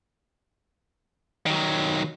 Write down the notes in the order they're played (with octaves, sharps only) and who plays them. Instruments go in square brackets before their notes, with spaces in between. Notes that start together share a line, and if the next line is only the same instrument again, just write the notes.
[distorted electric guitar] D#3 F#3